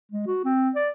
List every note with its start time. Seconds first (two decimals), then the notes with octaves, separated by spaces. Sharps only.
0.12 G#3
0.27 F#4
0.44 C4
0.75 D5